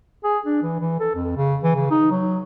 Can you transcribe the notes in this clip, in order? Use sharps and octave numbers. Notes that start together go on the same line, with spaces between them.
G#4
D4
E3
E3
A4
F2
C#3
E3
C#3
D#4
F#3